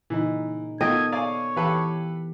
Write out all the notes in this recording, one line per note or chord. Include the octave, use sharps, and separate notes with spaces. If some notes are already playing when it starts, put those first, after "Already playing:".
A#2 C#3 E3 D#4
D#3 A3 B3 F4 A4 D#5 G5 G#6
C#5 D5 F5 G#5
E3 G4 A4 B4 F5